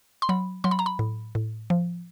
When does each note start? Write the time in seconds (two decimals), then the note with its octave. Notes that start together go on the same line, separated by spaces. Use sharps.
0.22 C6
0.29 F#3 B5
0.64 F#3 C6
0.71 B5
0.79 A#5
0.86 B5
0.99 A2
1.35 A2
1.70 F3